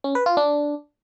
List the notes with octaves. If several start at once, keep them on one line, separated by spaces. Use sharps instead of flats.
C#4
B4
F4
D4